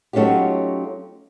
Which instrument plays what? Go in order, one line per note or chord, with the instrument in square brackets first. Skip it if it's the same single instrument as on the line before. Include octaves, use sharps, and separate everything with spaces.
[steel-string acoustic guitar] F#3 A3 C#4 D#4 F4 G4